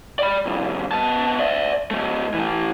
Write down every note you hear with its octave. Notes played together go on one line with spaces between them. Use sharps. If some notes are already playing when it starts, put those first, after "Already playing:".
D5 B5
C2 F2
B3 A5
D5 E5
F#3 A3
E3 A3